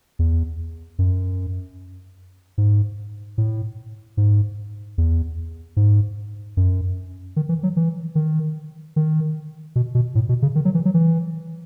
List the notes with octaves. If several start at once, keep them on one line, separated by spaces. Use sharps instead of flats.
E2
F#2
G#2
A2
G#2
E2
G#2
F#2
D#3
E3
F#3
E3
D#3
D#3
B2
B2
A2
B2
C#3
D#3
F#3
E3
F#3
E3